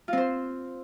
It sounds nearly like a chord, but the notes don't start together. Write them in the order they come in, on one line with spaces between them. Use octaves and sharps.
F4 C4 C5